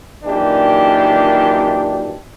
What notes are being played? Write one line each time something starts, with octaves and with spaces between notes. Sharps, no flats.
F#2 A#2 D#3 E3 D4 G4